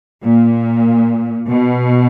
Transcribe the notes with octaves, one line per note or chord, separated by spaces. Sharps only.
A#2
B2